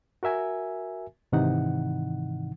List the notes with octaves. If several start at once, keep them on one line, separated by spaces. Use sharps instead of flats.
F#4 A#4 E5 G#5
G#2 C3 D#3 E3 D#4 F#5